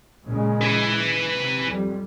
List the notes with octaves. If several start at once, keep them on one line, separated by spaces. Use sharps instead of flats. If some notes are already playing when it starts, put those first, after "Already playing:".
A#2 C#3 G#3
B4 G#5
C3
F2 G3